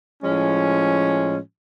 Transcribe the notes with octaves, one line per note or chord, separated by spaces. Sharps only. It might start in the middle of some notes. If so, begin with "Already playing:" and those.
A2 F3 G#3 C#4